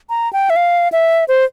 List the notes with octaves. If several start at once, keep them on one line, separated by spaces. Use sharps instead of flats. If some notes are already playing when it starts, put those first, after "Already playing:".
A#5
G5
E5
F5
E5
C5